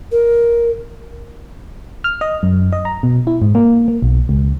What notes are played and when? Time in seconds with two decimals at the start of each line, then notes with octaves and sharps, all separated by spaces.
0.11 A#4
2.04 F6
2.21 D#5
2.43 F#2
2.73 D#5
2.85 A#5
3.03 B2
3.27 E4
3.42 G#2
3.55 A#3
3.88 A#3
4.02 B1
4.29 C#2